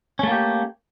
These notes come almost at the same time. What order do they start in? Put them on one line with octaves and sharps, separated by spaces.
C#4 A3 A#3 G4